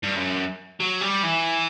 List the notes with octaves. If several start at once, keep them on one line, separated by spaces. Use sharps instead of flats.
G2
F#2
F#3
G3
E3